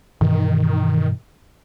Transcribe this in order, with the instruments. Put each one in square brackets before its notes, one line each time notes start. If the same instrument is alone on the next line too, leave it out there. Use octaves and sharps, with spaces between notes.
[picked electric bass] G2 B2 E3 [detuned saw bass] D#3